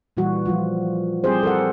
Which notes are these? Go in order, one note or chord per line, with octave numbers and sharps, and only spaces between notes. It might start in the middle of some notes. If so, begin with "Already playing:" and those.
A#2 E3 G3 F#4
F3 G3 F4
G3 C4 E4 G4 G#4 C5
A4 A#4 F#5